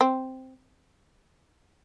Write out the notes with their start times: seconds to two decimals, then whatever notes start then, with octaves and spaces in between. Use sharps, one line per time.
0.01 C4